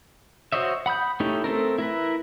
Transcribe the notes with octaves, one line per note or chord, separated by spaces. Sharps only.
F#4 C5 C#5 D#5 E5
F#5 B5 D#6 G6
A3 C#4 D#4 E4 G4
A3 C4 A4 A#4
E4 A#4 B4